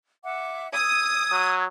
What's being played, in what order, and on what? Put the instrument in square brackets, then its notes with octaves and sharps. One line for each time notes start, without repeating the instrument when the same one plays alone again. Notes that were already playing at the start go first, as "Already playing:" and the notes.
[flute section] E5 F#5 D6
[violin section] D#6 [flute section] E6 G#6
[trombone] F#3